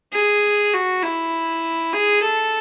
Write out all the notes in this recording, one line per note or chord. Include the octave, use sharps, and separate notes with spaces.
G#4
F#4
E4
G#4
A4